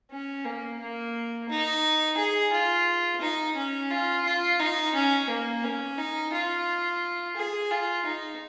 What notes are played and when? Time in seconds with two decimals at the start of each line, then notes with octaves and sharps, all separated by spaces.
0.11 C#4
0.45 A#3
0.80 A#3
1.50 D#4
2.18 G#4
2.53 F4
3.21 D#4
3.56 C#4
3.91 F4
4.26 F4
4.60 D#4
4.95 C#4
5.29 A#3
5.64 C#4
5.98 D#4
6.33 F4
7.36 G#4
7.71 F4
8.06 D#4